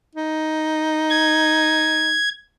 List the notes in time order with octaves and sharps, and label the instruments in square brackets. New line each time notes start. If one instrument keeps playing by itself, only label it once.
[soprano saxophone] D#4
[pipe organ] G#6